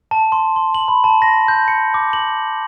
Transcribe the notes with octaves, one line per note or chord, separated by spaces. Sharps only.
A5
C6
C6
F#7
B5
A5
A#6
G6
C#7
D6
F#7